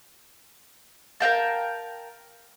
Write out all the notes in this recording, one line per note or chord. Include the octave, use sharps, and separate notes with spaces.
A#4 F5 G5 A5